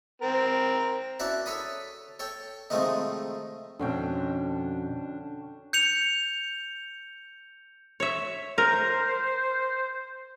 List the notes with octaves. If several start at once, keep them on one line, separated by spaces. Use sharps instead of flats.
C4 A#4
C#4 E4 F#4 D5 A5
A4 C#5 B5 D#6
A4 C#5 G5
C3 D#3 F3 G#3 A3 D#4
F2 B2 D3 C#4 D4 G5
G6 C#7 F7
C#5 E5
A#4 C5